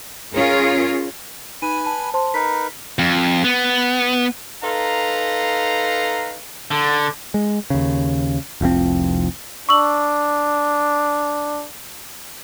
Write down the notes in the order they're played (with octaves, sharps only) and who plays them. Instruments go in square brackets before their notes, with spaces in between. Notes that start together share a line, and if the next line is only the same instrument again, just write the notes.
[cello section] C#4 F4 G#4 A#4 C#5
[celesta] D#4 D#7 [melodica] B4 G#5 B5
[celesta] A5
C5 A5 C6
[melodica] D#4 A#4 B4 [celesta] B6
[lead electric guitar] F2
B3
[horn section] D#4 A4 B4 F5 A#5 C6
[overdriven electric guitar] D3
[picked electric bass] G#3
D#2 C#3
F1 C2 F3 C4
[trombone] D4 [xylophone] C#6 E6 F#7